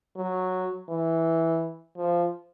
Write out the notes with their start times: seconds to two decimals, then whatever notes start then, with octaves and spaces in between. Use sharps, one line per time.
0.17 F#3
0.89 E3
1.97 F3